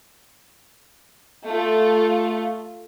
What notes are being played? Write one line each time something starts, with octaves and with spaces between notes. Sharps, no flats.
A3 F4